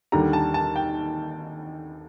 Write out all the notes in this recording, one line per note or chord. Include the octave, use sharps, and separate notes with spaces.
D#2 D3 G3 A#5
A5
A5
G5